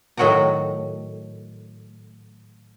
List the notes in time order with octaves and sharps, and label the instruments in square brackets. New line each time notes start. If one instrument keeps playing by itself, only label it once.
[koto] A2 D#3 F#3 F#4 G5 A#5